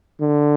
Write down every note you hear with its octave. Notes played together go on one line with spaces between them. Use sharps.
D3